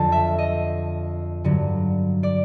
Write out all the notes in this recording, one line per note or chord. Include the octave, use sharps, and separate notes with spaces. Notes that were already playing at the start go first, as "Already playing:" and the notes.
Already playing: F2 D3 F3 A5
E5
D#5
G2 D3 F#3
D5